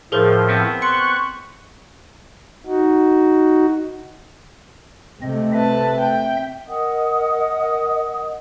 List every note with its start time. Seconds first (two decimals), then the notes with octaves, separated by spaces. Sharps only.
0.12 A2 F3 G#4 A#4 C5
0.49 B3 C4
0.82 C6 C#6 F#6 C#7
2.66 D#4 F#4
5.22 C3 A3 C4 D#5
5.53 C4 B4 E5 A5
6.00 G5
6.67 A#4 D#5 F#5 D#6